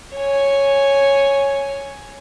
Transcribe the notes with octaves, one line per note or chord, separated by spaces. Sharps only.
C#5 G#5